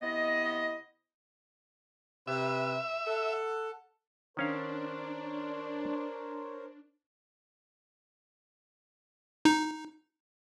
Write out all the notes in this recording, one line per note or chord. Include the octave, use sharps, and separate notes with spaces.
C3 B3 E4 D#5
C3 B4 E5
A4 F#5
D#3 C#4 D4 A#4 C5 C#5 F5
D#4